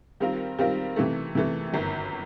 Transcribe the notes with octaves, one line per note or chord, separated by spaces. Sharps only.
D#3 G3 C4 F4 A#4
D#3 G3 C4 F4 A#4
C3 E3 A3
C3 E3 A3
G1 F#2 D#3